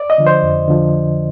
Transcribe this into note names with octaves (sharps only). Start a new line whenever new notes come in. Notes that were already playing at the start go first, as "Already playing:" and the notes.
Already playing: D5
D#5
D3 F3
C5
F2
D3 F3